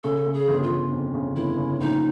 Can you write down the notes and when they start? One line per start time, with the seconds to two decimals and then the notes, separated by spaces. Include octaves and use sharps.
0.04 C#3 A4
0.26 C#3
0.33 G#4
0.48 G1
0.63 F4
0.71 G1
0.92 F2
1.14 C#3
1.36 G1 E4
1.58 C#3
1.80 A#1 D#4